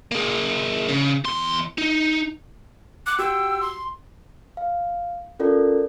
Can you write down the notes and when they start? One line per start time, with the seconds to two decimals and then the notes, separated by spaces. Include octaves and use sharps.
0.12 A#3 G#4
0.89 C#3
1.25 E2 C6
1.78 D#4
3.06 D6 F#6
3.19 F#4 G4 G5 E6
3.61 C6
4.57 F5
5.39 C#4 F4 A4 A#4 D5